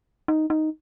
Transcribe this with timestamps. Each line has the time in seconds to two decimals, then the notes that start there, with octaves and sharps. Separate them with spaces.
0.28 D#4
0.50 D#4